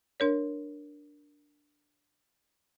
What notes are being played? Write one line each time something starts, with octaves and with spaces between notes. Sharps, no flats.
D4 A#4 C#5